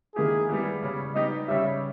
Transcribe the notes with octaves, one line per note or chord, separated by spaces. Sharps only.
D#3 A#3 E4 G4 G#4
G3 B3 E4 G4
C#3 G3 C#4 G4
G3 B3 D#4 G4 D#5
C#3 G3 C#4 G4 E5